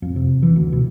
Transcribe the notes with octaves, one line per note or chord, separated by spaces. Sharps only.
F2
C3
E3
D2
B2